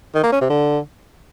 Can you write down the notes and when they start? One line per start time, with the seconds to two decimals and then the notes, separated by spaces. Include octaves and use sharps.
0.15 D#3
0.23 A#3
0.32 C#4
0.41 C3
0.50 D3